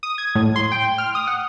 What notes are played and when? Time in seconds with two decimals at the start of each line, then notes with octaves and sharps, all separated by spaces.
0.03 D#6
0.18 G#6
0.35 A2
0.56 C6
0.72 G5
0.98 F6
1.15 D#6
1.27 F#5